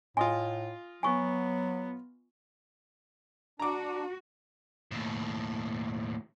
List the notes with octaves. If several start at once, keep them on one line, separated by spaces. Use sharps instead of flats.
A2 F4 D#5 G#5 C6
F#3 B3 G#5 C#6
D4 F#4 A#5 D6
D#2 A2